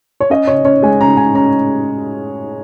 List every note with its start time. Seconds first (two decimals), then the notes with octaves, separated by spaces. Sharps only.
0.20 C#5
0.30 C#4 D#5
0.47 C#3 C#5
0.65 C#4 C#5
0.82 G#3 G#5
1.01 C#3 A#5
1.17 C#3 G#5
1.35 C#4 A#5